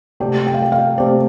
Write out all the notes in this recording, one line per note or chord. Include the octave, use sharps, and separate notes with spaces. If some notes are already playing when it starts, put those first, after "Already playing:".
C3 A3 C4 G4 D5 G5
G5
F5
G5
F5
C3 A3 C4 G4 C5 D5